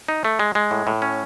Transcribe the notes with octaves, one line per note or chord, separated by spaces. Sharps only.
D#4
A3
G#3
G#3
A2
A2
C#4